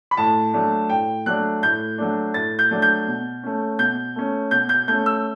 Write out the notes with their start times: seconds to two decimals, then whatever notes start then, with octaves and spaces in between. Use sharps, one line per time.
0.11 B5
0.17 A2 A5
0.54 F#3 A3 D4
0.89 A2 G5
1.26 F#3 A3 D4 F#6
1.63 A2 G6
1.98 F#3 A3 D4
2.34 A2 A6
2.59 G6
2.71 F#3 A3 D4
2.82 G6
3.07 B2
3.43 A3 C#4
3.79 B2 G6
4.16 A3 C#4
4.51 B2 G6
4.69 G6
4.88 A3 C#4 G6
5.06 E6